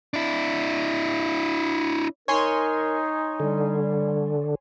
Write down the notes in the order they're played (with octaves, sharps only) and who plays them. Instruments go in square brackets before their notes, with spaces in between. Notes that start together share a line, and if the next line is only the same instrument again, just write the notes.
[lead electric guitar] D4 E4
[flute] D#4 [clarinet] A#4 [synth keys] C#5 G#5 C6
[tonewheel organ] D3 [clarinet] G3